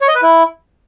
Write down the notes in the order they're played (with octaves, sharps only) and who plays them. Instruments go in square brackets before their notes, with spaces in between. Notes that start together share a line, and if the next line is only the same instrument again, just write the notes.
[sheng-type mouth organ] C#5
D#5
B4
E4